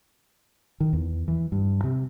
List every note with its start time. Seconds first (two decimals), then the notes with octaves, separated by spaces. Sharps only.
0.80 D#3
0.93 E2
1.28 E3
1.52 G2
1.84 C3